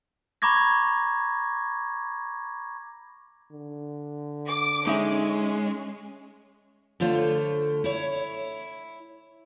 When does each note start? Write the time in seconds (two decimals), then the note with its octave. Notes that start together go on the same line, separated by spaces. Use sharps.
0.42 A#5 B5 C#6 D6 G#6 A#6
3.52 D3
4.48 D6
4.87 G#3 C#4 D#4 E5
7.00 D3 A3 F4 C5 C#5
7.84 E4 C#5